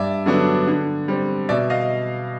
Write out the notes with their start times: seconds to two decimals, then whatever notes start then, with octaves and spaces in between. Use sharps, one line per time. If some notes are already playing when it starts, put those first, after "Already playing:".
Already playing: G2 D5 E5
0.26 D3 F#3 B3 D4
0.67 D3
1.08 G3 C4
1.49 B2 D5 E5
1.70 D#5 F5